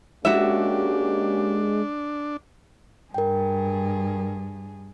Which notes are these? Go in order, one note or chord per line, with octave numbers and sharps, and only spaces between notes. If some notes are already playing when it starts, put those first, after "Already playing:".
G#3 A#3 C#4 D4 F#4 G4 E5
G2 G#4 A#4 G5